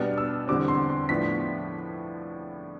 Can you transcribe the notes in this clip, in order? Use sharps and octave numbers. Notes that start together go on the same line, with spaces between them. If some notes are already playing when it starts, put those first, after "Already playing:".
Already playing: B2 G3 B3 D4 F6
E6
E2 D3 G3 C4 D6
C6
C6
A2 F3 B3 D4 B6